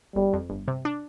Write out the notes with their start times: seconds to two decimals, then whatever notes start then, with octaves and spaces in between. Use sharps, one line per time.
0.15 G1 G3
0.33 F2
0.50 G1
0.68 C3
0.85 D4